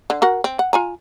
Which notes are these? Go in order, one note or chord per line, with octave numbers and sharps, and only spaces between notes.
D3
F#4 A#4 F#5
C4
F#5
F4 G#5 A#5